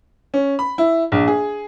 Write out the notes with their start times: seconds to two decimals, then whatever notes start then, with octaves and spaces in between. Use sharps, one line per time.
0.34 C#4
0.59 B5
0.78 E4
1.12 A#1
1.28 G#4